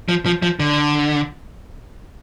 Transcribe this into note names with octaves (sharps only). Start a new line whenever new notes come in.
F3
F3
F3
D3